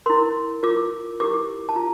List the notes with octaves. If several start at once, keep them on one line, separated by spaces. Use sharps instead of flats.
E4 A#4 C6
F4 A#4 D6
E4 G4 A#4 D6
A5
F4 A#5